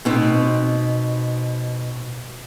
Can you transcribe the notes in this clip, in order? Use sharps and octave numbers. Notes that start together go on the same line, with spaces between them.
B2 C4 D#4